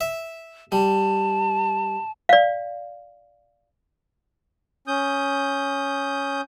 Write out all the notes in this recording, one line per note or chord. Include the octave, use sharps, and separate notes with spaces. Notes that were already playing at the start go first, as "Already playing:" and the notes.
E5
G3 A5
D5 F5
C#4 D#6 G6